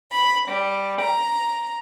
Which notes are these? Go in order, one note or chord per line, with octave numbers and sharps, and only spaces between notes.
B5
G3
A#5